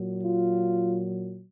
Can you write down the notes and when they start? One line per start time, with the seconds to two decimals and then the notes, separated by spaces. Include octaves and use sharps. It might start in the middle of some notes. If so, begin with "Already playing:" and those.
Already playing: A#2 F#3
0.22 F4